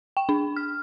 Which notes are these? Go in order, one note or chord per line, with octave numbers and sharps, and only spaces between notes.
G5
D4
F6